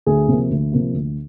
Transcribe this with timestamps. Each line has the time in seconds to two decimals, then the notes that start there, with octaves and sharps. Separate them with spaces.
0.06 D2 G#4
0.28 C3 F3 A#3
0.50 D2
0.72 C3 F3 A#3
0.94 D2